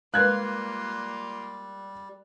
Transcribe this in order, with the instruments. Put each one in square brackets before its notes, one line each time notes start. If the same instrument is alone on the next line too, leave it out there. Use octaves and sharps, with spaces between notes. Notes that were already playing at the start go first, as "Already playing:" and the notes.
[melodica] G3 [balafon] G#3 A#4 B4 [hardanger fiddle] A#3 F4 [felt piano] F#6 G#6